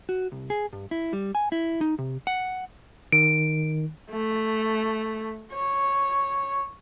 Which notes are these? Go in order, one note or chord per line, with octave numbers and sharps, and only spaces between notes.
F#4
C2
G#4
G2
E4
G3
G#5
E4
D#4
C3
F#5
D#3 D7
A3
C#5